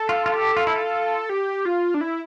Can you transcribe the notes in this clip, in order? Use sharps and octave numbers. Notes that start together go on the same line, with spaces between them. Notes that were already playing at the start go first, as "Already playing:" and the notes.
Already playing: A4
F4
F4
G4
F4
E4
F4
G4
F4
D4
E4